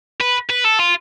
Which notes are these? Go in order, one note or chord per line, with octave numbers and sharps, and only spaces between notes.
B4
B4
A4
F4